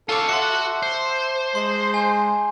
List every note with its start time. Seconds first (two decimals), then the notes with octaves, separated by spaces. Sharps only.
0.09 F4 A4 C#5 A5 D6
0.29 F#4 E5 F#5 C6 C#7
0.83 C5
1.55 G#3 C6
1.94 G#5